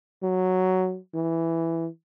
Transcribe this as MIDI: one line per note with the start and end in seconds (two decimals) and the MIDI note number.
0.23 0.97 54
1.14 1.87 52